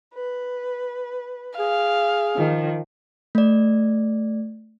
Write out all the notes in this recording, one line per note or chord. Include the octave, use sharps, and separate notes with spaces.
B4
G#4 F5
D#3 F3
A3 D5